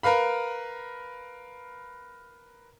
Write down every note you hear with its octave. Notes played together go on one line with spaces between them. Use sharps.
A#4 B4 F5 B5